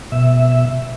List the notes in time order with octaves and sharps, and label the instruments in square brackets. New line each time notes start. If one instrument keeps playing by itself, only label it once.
[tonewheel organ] B2 E5